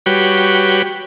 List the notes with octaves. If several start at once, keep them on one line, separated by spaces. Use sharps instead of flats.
G3 F#4 B4 C#5 G5